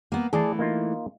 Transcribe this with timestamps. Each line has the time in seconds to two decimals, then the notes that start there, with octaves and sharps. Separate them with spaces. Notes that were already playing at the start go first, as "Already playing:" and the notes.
0.12 A#3 B3
0.33 E3 A3 G#4 D5 A5
0.59 A#3 D#4 F4